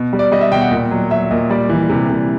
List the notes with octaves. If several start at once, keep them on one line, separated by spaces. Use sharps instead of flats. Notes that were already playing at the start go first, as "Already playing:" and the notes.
Already playing: B2
G3
D5
G3 D#5
E5
B2 G5
F#5
A#2
F#3
F#3 E5
A#2 D#5
G3 D5
E3
C3
C3